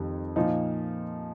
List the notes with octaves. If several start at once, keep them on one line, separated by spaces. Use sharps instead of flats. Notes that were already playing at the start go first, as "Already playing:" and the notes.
Already playing: F2 D#3 G3 D#4
A#2 F3 D#4